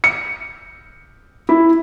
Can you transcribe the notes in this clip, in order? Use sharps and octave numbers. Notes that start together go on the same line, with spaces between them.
C#7
E4